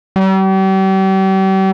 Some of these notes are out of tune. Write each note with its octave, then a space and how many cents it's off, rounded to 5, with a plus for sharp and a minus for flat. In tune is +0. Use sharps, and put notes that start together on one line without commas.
G3 -40